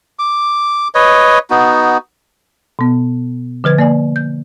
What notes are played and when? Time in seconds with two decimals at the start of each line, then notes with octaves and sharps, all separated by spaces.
0.19 D6
0.95 B4 C#5 D#5
1.50 B3 D#4 F#4
2.79 B2 B3
3.64 D3 F3 B4 G#6
3.78 A#3 D5 G#5
4.16 G6